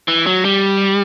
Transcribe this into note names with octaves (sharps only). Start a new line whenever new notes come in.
E3
F#3
G3